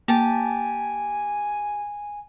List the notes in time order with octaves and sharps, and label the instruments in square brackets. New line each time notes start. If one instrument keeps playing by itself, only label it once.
[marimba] A#3 [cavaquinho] G4 A5 [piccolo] G#5